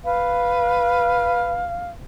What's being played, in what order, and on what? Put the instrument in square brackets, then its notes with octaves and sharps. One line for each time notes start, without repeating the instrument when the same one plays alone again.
[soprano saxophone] B4 [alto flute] F5